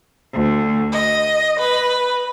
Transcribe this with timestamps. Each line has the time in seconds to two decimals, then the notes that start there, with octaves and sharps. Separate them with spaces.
0.33 D2
0.92 D#5
1.59 B4